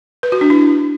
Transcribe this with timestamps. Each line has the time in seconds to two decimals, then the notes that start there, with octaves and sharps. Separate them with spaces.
0.23 B4
0.32 F#4
0.41 D4
0.50 E4